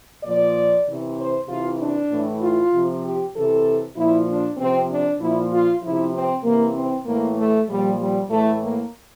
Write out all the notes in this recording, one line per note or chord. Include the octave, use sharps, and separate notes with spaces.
A#2 F3 D5
C3 E3
C5
C3 E3 F4
D4
A2 E3
F4
C3 F3
G4
C3 E3 A4
A#2 F3 E4
D4
C3 F3 C4
D4
A#2 F3 E4
F4
C3 F3 E4
C4
C3 E3 A#3
C4
A2 E3 A#3
A3
A#2 F3 G3
G3
A2 E3 A3
A#3